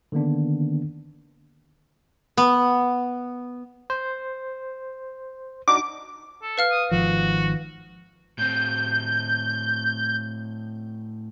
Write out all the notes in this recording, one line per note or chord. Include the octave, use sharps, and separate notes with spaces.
D3 D#3 A#3 B3 D4
B3
C5
D4 D#4 F#4 D6
A4
B4 F5 F6
D#6
G#1 D#3 F3 F#4
A2 C4 G6